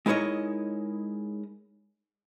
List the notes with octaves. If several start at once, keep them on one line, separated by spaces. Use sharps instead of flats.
G#3 D#4 E4 A#4 C#5 D#5